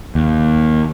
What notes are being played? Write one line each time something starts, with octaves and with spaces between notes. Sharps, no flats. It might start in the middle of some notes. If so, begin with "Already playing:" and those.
D#2